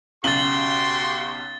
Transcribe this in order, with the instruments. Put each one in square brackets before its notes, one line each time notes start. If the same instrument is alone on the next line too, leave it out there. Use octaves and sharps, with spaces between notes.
[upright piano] B1 C#3 F#7 [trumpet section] F#4 G4 C6 [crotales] A6 G7